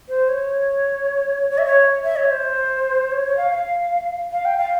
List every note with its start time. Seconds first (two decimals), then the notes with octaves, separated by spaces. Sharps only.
0.09 C5
0.29 C#5
1.50 C#5
1.58 E5
1.66 C#5
2.03 E5
2.16 C#5
2.31 C5
3.11 C#5
3.24 C#5
3.37 F5
3.51 F5
4.32 F5
4.45 G5
4.58 F5